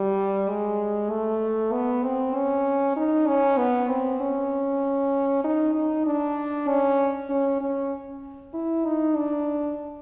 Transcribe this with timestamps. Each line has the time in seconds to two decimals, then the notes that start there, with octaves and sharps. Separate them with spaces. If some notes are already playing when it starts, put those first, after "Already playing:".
Already playing: G3
0.49 G#3
1.10 A3
1.72 B3
2.03 C4
2.35 C#4
2.96 D#4
3.27 C#4
3.58 B3
3.89 C4
4.20 C#4
5.44 D#4
5.75 D#4
6.06 D4
6.68 C#4
7.30 C#4
7.61 C#4
8.53 E4
8.85 D#4
9.16 D4